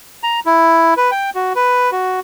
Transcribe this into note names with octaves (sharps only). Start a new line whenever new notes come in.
A#5
E4
B4
G5
F#4
B4
F#4